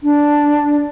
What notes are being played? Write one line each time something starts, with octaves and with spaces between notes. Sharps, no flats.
D4